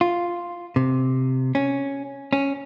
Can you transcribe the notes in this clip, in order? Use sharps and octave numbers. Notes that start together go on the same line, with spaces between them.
F4
C3
C#4
C#4